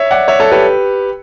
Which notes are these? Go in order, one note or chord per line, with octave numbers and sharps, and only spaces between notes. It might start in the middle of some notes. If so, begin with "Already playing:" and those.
Already playing: C#5 E5
D5 F#5
C#5 E5
A4 C#5
G4 B4